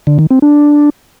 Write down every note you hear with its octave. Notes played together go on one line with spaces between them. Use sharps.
D3
D#3
C4
D4